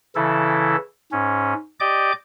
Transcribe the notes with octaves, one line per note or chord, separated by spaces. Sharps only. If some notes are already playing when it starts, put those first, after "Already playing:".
C#3 E3 E4 A4
G#2 C#4
G4 D5 D#5 D6 G6